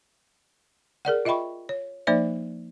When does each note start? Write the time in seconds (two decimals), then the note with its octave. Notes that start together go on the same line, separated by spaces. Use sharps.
1.05 G#4 A#4 D5 F#5
1.25 F4 D#5 E5 G5 B5 C#6
1.69 C#5
2.07 F3 A#3 D#4 C5 D5 E5